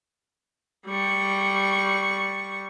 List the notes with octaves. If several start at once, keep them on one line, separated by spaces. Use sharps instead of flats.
G3 C#6